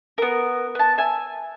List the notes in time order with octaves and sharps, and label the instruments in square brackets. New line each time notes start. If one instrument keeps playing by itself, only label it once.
[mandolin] B3 A#4
B3 A5
E5 G#5